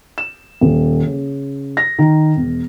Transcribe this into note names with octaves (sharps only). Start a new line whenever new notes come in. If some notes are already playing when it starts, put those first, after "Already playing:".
E7
D#1
C#3
A#6
D#3
E1